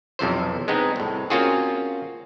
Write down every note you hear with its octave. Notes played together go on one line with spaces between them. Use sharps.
B1 F2 C3 E3 C5
G#3 B3 C4 D#4
C2 A2
A#3 C4 C#4 F4 F#4 G#4